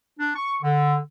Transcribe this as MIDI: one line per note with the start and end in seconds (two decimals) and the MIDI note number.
0.20 0.33 62
0.36 0.56 85
0.63 0.98 50